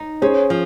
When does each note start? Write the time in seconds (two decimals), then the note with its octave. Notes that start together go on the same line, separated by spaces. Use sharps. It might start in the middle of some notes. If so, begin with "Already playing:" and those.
Already playing: D#4
0.22 C#4 G#4 C5
0.50 F3